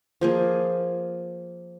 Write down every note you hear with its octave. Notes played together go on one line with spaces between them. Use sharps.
F3 A#3 G#4